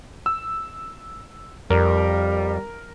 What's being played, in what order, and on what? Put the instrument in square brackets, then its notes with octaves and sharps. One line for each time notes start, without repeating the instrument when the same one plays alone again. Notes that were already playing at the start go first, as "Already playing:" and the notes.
[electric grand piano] E6
[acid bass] F2 [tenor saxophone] G3 [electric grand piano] A#4